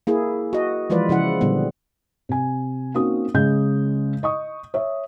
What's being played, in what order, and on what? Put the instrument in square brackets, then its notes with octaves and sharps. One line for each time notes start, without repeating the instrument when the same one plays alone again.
[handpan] A#3 E4 G#4
F#4 D#5
E3 F3 G#3 F4 B4 D5
C#3 F3 E4 F#5
A#2 D3 G3 B3
[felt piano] C3 G#5
A#3 C4 C#4 D#4 F#4 D#6
C#3 G#3 D#5 G6
D#5 C#6 D#6
C#5 E5